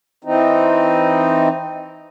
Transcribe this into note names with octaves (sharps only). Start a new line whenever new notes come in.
E3 C4 D#4